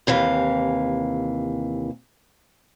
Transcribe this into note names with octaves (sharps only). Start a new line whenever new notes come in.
D#2 C3 E3 F5